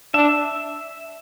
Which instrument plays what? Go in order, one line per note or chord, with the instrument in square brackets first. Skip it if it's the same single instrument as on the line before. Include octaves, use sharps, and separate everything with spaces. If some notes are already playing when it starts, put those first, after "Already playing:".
[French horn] D4 [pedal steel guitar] E5